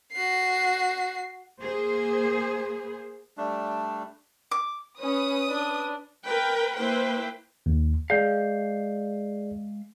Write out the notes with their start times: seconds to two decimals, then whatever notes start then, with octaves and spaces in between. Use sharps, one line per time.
0.13 F#4 C7
1.60 A#3 G#4 C5
3.37 G3 A3 D4
4.51 D6
5.00 C#4 B4 D#6
5.48 D4
6.23 A#4 B4 G5
6.77 A#3 E4 B4 C5 G5
7.66 D#2
8.10 G#3 G#4 D5 F5 G6